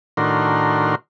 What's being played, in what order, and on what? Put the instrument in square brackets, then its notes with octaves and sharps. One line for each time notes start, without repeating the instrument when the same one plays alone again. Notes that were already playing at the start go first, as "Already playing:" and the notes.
[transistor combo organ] A2 D#3 D4 F#4 A#4 C6